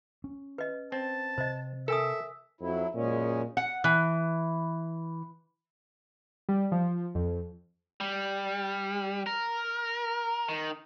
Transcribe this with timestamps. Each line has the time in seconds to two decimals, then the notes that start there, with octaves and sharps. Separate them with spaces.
0.24 C#4
0.58 B4 D#5
0.92 C4 A5
1.38 C3 C5 D#5
1.88 A4 A#4 E5 G#5 D#6
2.61 F2 F#3 E4
2.94 F#2 A#2 G#3 C#4
3.57 F#5
3.84 E3
6.49 G3
6.72 F3
7.15 F2
8.01 G3
9.27 A#4
10.49 D#3